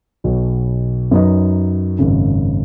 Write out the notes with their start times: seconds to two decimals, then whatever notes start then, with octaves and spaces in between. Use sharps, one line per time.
0.24 B1 B2 F#3
1.11 F#2 F#3 D#4 B4 D#5
1.99 G#1 F#2 C#3